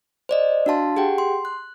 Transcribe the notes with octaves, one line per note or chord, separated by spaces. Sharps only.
C5 D5 D#5
D4 F#4 F5 A5 C6
G4 G#4 F#5 G5
C6
F#6